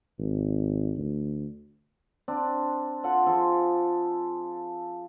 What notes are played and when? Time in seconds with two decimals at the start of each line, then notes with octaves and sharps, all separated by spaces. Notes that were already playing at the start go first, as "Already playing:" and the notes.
0.19 G#1
0.98 D2
2.28 C4 D4
3.04 F4 A4 F#5 A5
3.26 F3 G#4 A4 C6